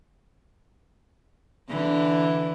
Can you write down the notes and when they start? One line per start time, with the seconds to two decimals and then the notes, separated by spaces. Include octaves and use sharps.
1.70 D3 E3